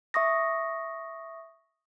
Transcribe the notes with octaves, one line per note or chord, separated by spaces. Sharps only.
E5 C#6 D#6 A#6